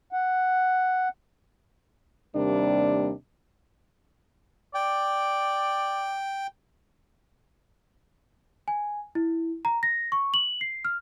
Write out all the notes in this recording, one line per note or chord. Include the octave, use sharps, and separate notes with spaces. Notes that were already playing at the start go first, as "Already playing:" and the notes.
F#5
D#2 C3 G3 A#3 D4
D5 G5
G#5
E4
A#5
A#6
C#6
F#7
C7
F6